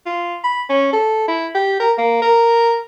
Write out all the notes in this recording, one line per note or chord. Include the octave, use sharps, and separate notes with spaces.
F4
B5
C#4
A4
E4
G4
A#4
A#3
A#4